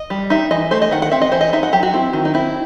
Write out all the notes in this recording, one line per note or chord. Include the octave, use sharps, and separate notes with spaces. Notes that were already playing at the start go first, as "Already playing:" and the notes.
Already playing: D#5
G3
D#4 E5
E3 D#5
A3 C5
D#5
D#3 F#5
F#5
C4 E5
D#5
E3 C5
D#5
D#4 E5
F#5
F#3 G4
F#4
C4 E4
D#3
D#4
C4 E4